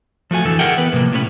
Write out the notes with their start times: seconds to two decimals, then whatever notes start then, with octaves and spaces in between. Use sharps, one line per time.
0.31 F3 A3 F#4 G#5
0.45 F2 D3 E3 A4
0.59 G#4 A#4 E5 F#5 G5
0.78 E3 B3 B4
0.92 A2 C3 F3 A#3
1.13 A2 C3 A3 C#4 B4